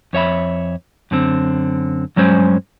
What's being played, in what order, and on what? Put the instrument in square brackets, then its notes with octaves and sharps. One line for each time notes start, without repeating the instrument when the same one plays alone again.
[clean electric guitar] F2 C#5 E5 B5
F#2 D3 C4
G2 F#3 G#3 C#4 C5